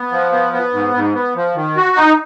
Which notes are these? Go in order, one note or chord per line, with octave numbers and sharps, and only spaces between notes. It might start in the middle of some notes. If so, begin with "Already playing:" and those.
Already playing: B3
F3
B3
B3
G#2
G#2
B3
F3
D#3
F#4
D#4